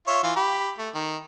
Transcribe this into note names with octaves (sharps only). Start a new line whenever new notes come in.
F4 C#5 E5
E3 F4
G4 B5
A3
D#3